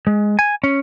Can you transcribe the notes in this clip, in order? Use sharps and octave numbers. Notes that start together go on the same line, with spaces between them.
G#3
G#5
C#4